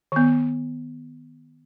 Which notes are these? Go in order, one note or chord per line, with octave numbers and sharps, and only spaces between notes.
D#3 B3